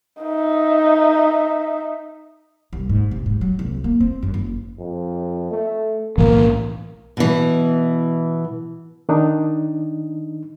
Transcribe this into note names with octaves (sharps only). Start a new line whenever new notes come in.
D#4 E5
C2
G#2
C3
G#2
F#3
C2
A#3
C4
F#2
F#1
F2
A3
B1 A2 E3 A#3
B2 E3
D#3 D4 D#4